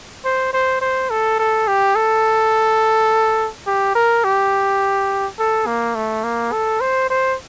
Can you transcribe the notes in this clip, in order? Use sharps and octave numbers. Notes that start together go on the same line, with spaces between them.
C5
C5
C5
A4
A4
G4
A4
G4
A#4
G4
A4
A#3
A3
A#3
A4
C5
C5